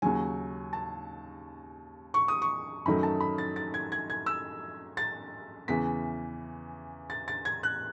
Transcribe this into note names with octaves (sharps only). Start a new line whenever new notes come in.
D#2 C#3 F#3 G#5
A5
C#6
D#6
C#6
F#2 D#3 F#3 A3 B5
A5
B5
A6
A6
G#6
G#6
G#6
E6
A6
E2 C#3 E3 B6
A6
A6
G#6
F#6